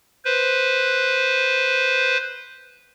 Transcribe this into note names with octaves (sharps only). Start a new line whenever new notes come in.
B4 C5